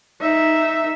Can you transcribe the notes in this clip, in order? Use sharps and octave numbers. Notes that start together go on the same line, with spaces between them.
D#4 E5